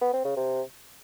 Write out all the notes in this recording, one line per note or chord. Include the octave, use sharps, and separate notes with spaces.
B3
C4
C#3
C3